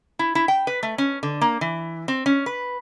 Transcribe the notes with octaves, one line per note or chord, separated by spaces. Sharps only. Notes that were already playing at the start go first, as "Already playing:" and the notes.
E4
E4
G5
B4
A3
C#4
D3
A#3
E3
C4
C#4
B4